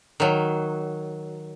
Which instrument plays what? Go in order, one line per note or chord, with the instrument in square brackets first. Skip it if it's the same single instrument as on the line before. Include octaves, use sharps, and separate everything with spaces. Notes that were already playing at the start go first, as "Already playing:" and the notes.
[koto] D#3 F#3